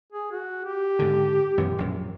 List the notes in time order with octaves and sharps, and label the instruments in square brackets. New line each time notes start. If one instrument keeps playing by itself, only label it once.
[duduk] G#4
F#4
G4
[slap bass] G#2 D3
F#2 B2 E3
A#1 F#2